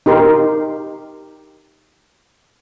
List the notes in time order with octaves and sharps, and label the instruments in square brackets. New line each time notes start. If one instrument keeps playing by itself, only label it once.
[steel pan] D#4 G4 A#4 C6